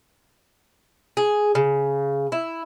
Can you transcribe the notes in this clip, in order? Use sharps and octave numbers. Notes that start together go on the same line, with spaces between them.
G#4
C#3
E4